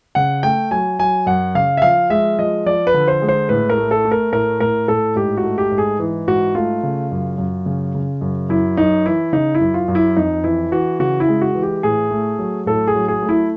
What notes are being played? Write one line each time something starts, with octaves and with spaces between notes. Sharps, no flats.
C#3 F#5
A3 G5
F#3 G#5
F#3 G#5
F#2 F#5
C#3 F5
E5
F3 F5
G#3 E5
F3 D#5
F3 D5
B4
D3
C5
G#3
C5
A2 B4
A#4
A3
A4
A3
A#4
A2 A#4
A2 A#4
A2 A4
G#2 G4
F#4
A3
G4
G#2
G#4
E3
G#2 F#4
A3 F4
C#3
F#2
F#2
C#3
C#3
F#2
F#2 E4
F#2 D#4
E3 E4
C#3 D#4
E4
F#2
F4
F#2
E4
F2 D#4
E3 E4
E3 F#4
C#3 F#4
E4
G#3
F#4
E3
G4
A2 G#4
A3
F#3
A2 A4
G#4
F#3
G#4
A3
E4